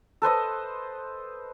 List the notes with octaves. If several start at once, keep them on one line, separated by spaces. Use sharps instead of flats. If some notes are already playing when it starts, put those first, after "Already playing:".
A4 B4 C5 D#5